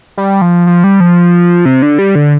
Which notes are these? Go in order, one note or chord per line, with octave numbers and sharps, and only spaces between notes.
G3
F3
F3
G3
F3
C3
D3
G3
D3